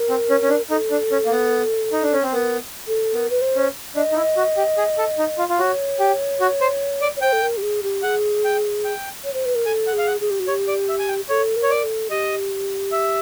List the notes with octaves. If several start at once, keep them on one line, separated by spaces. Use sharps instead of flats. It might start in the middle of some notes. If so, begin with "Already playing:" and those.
Already playing: A#4
C4
C#4
C#4
D4
D#4 A4
D4
C#4
A#3
B3
D#4
D4
C#4
C4
B3 A#4
A4
B3 A#4
B4
C5
C#4
D4 D#5
D#4
E4
F#4
G4
G#4
A4
D#4
F4
F4
F#4 C#5
G4
F#4
C5
D5
C#5
C5 G5
A4
A#4
G4
G#4
G4
G#4 F#5
G5
G5
C#5
C5
B4
A#4
A4 G#5
F#5
G#4 F5
F#5
G#4
G4
F#4
G4 C#5
D5
E5
G#5
G5
A4 C#5
A#4
C#5
D5
A4
G4 D#5
E5